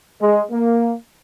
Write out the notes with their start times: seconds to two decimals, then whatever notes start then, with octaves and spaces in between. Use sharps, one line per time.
0.21 G#3
0.51 A#3